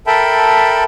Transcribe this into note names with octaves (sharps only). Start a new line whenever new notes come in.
A4 A#4 E5 G5 A5 B5